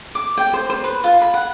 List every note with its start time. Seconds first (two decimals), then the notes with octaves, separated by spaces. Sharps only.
0.15 D6
0.38 G5
0.54 C5
0.70 C5
0.84 B4
1.04 F4
1.22 B5
1.34 F#5